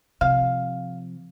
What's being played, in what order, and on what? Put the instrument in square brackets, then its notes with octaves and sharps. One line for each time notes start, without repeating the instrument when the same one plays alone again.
[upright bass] C3 F3 [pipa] F5